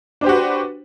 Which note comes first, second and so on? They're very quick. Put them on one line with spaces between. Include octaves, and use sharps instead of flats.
D4 C5 G4 F#4 B4